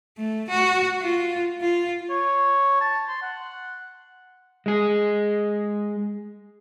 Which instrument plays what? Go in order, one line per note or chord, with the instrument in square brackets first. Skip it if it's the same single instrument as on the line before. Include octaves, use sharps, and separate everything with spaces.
[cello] A3
F#4
F4
F4
[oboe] C#5
A5
C6
F#5
[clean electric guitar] G#3 G#4